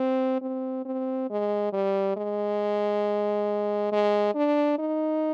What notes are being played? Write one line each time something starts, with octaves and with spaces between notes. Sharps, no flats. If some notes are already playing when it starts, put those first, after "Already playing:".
Already playing: C4
C4
C4
G#3
G3
G#3
G#3
D4
D#4